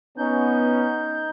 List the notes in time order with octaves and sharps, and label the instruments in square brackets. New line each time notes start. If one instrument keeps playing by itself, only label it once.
[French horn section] B3 [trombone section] C#4 [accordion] D#4 G6